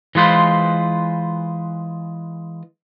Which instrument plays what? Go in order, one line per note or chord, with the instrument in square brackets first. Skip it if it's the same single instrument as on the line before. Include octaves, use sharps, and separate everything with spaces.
[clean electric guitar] E3 G#3 F4 B4 C5